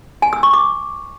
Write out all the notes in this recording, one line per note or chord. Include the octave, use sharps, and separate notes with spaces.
G#5
E6
C#6
D6